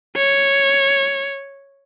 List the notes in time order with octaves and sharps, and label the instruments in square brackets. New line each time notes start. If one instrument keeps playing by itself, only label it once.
[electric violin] C#5